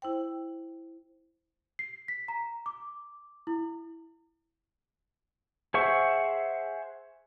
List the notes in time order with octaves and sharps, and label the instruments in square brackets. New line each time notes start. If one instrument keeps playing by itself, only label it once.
[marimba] E4 C5 G5
[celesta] C7
B6
A#5
D6
E4
[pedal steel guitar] G#4 C5 E5 F#5 C#6